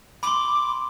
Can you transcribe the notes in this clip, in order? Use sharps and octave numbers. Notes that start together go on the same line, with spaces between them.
B5 C6 D6